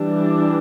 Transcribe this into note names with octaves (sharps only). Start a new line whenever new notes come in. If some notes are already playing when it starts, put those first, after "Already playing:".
Already playing: E3 G3 D4